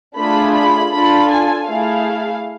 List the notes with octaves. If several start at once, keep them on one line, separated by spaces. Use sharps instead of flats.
A3 D4 F4 G#4 B5
B5
D4 F4 A4 B5
G#5
A3 E4 G#4 F5